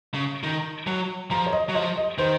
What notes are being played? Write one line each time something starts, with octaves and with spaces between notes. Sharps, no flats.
C#3
D#3
F#3
F3 A#5
C#5
D#5
F#3
F3 D#5
D#5
D#3 C5